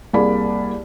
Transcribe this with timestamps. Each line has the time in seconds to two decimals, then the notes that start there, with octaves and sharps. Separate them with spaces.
0.13 C2 A#3 G#4 D5 B5